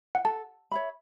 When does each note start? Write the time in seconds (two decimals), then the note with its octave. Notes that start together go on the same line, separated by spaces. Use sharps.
0.15 F#5
0.25 A4 A5
0.72 C#5 E5 B5